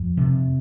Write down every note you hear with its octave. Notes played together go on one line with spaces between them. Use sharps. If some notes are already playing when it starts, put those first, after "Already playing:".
Already playing: F2
C3